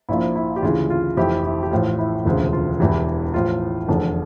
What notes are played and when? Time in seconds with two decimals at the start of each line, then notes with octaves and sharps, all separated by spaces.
0.09 A#1 A#2 F3 E4
0.36 E4
0.56 G4
0.62 D2 C#3 E3 F4
0.90 F4
1.17 F1 F2 E3 E4 G4
1.45 E4
1.63 G4
1.71 A1 A2 F3 F4
1.99 E4
2.25 E1 D2 C#3 F3 F4
2.53 F4
2.80 E1 E2 E3 E4 G4
3.34 A1 A2 F3 F4
3.88 F1 E2 D3